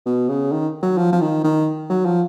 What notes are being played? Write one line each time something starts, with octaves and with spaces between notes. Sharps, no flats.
B2
C#3
D#3
F#3
F3
F3
D#3
D#3
F#3
F3